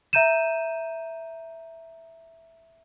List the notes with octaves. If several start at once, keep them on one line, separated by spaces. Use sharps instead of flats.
E5 A#5 G6 D#7 E7